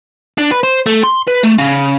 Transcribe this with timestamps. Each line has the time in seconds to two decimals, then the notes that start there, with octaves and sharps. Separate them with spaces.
0.38 D4
0.51 B4
0.63 C5
0.86 A3
1.03 C6
1.27 B4
1.43 A3
1.58 C#3